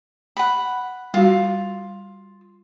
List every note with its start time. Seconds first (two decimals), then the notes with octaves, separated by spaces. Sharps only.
0.37 F#5 B5
1.14 G3 F4 F#4